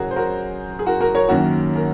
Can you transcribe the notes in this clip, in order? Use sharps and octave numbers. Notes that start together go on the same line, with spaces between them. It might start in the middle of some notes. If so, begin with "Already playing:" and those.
Already playing: F#2 C#3 F#4 G#4 A#4 C#5
C5
F#4 A#4
G#4
F#4 A#4
F#4 A#4
A#4 C#5
F#2 D#3 A#3 C#4 F#4 A#4
A#4